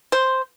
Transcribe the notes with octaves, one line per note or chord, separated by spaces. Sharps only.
C5